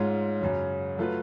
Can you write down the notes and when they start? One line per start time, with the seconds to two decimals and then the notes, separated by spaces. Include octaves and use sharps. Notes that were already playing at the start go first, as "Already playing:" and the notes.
Already playing: G#2 G#3 C#4 F4
0.40 F#2 C#3 F#3
0.98 F#3 A3 F4 B4